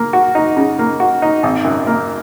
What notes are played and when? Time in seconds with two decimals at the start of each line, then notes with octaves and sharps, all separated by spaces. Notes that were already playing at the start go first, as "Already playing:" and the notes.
Already playing: A#3
0.13 F#4
0.35 D#4
0.57 C#3
0.79 A#3
1.00 F#4
1.22 D#4
1.43 G#1
1.65 F#2
1.87 A#3